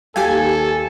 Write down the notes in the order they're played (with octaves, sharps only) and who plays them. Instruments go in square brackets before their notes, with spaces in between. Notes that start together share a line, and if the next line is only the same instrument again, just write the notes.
[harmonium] D#2 [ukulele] G4 F5 [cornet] A4 [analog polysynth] G#5